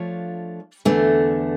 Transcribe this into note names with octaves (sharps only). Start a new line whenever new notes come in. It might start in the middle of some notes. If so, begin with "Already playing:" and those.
Already playing: F3 A3 D4 F4 C#5
E2 D3 A3